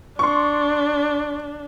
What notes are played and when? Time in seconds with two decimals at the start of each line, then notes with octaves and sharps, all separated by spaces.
0.19 D4 C6 C#6